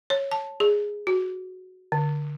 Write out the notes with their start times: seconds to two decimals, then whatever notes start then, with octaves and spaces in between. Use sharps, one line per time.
0.10 C#5
0.32 A5
0.60 G#4
1.07 F#4
1.92 D3